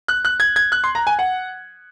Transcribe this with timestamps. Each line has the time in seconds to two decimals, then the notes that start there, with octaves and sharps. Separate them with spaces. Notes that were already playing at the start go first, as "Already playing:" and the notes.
0.08 F#6
0.25 F#6
0.40 G#6
0.56 G#6
0.72 F#6
0.84 C6
0.95 A#5
1.07 G#5
1.19 F#5